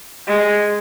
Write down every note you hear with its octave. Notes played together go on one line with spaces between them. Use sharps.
G#3